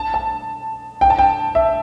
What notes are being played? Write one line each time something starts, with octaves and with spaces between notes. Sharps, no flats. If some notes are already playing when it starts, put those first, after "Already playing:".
Already playing: A5
A5
G5
A5
G5
E5